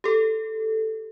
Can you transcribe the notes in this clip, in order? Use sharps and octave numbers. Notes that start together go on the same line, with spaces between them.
G4 A4